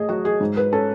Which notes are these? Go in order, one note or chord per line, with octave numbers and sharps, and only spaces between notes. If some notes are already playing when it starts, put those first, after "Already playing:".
Already playing: A3 G#4 D#5
F#3 F#4
G#4
G#2
B4
C#4 A4